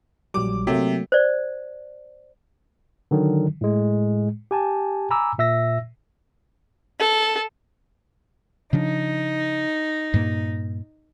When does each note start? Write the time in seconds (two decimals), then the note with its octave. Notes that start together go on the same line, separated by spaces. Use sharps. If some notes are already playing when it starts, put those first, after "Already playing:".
0.34 A#1 F#3 G3 D6
0.67 C3 F#3 A3 A#3
1.12 C5 D5
3.11 D3 D#3 F#3
3.61 A2 G#3
4.51 G4 G#5 A5
5.10 G#5 A#5 B5 D6 E6
5.38 A#2 E5 E6 A#6
7.00 A4
8.73 C#3 F3 D4 D#4
10.14 G2 A#2 A#3